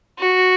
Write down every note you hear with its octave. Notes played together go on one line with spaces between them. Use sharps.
F#4